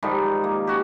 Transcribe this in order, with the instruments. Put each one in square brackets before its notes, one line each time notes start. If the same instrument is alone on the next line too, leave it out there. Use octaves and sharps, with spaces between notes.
[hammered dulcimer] G#2 D#3 F3 G3
A#3
C#4 F#4 G4